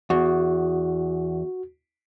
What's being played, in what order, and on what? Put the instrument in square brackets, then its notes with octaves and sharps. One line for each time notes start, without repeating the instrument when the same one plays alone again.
[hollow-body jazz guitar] E2 [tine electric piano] F#4